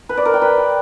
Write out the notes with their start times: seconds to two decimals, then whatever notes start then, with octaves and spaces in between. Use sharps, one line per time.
0.09 B4
0.17 D5
0.25 A#4
0.34 G5
0.42 B4